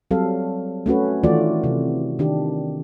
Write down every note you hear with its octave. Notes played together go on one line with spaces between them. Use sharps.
F#3 G3 C4 A4 F5
A3 C#4 F#4 B4
D#3 E3 A3 F4 F#4 D5
C3
D#3 D4 G4